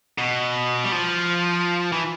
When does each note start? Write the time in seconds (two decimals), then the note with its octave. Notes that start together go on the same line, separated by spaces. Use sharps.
0.18 B2
0.84 G3
0.92 F3
1.92 E3